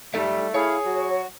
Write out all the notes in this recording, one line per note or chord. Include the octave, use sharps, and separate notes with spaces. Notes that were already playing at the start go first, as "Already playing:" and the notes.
G3 A3 D#4 A4 E5
E4 G#4 C#5 F5
F#3 F#4